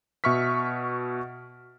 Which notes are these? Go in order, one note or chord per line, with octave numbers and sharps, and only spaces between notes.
B2 E5 C#6 F6 B6